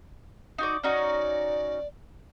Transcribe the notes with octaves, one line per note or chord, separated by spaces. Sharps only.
D#4 F#4 D5
C#4 D#4 F#4 D5